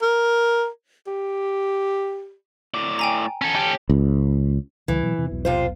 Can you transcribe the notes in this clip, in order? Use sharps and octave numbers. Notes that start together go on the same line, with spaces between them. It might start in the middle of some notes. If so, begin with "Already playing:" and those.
A#4
G4
A2 D5
G5 G#5 A#5
C#4 A4
G4
C#2
C#2 D3 E3 G3
B2 F#3
E2 C3
E1 B1 B2
C3 F4 C5